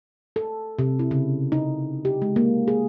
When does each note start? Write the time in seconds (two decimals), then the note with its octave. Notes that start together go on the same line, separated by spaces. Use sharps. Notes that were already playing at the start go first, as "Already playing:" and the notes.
0.36 A4
0.79 C3
0.99 E4
1.11 C#3
1.52 D#4
2.05 G4
2.22 G#3
2.36 A#3
2.68 G#4